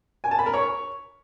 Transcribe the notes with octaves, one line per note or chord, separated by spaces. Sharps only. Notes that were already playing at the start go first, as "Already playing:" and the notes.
G#5
A5
B5
A#4
C#5